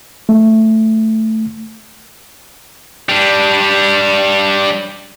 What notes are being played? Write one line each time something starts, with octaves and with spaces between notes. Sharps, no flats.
A3
G3 D4